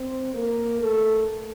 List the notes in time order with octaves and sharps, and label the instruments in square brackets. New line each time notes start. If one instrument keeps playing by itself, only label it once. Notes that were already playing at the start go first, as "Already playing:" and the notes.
Already playing: [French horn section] C4 C5
A#3 A#4
A3 A4